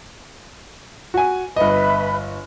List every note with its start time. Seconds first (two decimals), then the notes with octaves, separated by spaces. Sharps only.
1.14 F#4 G#5
1.56 G1 B4 D#5 E5 B5